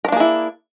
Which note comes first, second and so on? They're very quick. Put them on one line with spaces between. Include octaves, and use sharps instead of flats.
A#4 D4 A#3 G#4 E4